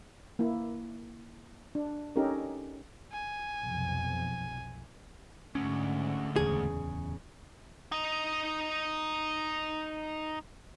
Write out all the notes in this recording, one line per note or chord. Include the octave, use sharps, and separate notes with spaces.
A#3 E4
D4
C#4 D#4 G4 A4 A#4
G#5
B1 F2 C3
D2 G#2 D3 C#4
D1 E2 C#3 G#4
D#4 D#5